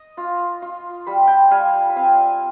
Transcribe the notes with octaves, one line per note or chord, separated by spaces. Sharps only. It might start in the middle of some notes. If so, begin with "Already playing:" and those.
Already playing: D#5
F4
F4
G3 B5
G5 B5
G3 F5 G#5
B5
C4 F5 G#5